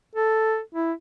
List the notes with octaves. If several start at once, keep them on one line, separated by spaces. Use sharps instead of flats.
A4
E4